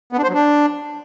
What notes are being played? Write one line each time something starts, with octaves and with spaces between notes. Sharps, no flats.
B3
D4
C5
F#3
D4